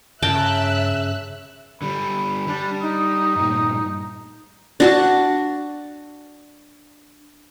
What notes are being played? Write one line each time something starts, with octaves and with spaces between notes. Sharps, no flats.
G2 C#3 A#4 E5 G5 A5 E6 F#6
D3 G3 B5
G3 D4
D#4 D#6
G2 A#2
D4 F#4 A5